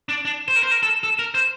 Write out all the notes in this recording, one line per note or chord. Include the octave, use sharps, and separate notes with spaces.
D4
D4
C5
A#4
C5
A#4
A4
A4
A#4
C5